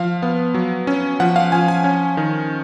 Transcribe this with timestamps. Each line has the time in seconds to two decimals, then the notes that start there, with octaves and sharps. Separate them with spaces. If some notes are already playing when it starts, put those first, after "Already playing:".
Already playing: F3 F5
0.22 B3
0.54 F#3
0.87 C#4
1.20 F3 F#5
1.36 F5
1.52 F3 G#5
1.68 G#5
1.84 C#4
2.17 D#3